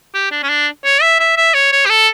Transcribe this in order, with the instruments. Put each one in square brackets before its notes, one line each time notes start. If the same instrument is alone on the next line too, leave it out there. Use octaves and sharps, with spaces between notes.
[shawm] G4
D4
C#4
D4
C#5
E5
E5
E5
C#5
C#5
G4
A4